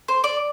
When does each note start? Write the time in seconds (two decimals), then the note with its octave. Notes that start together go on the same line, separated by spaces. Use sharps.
0.08 C5
0.24 D5